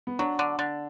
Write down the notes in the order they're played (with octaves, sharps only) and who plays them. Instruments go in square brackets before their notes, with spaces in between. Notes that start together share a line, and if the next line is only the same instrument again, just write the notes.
[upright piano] B3
[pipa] F#3 [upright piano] D4
[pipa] D3
D3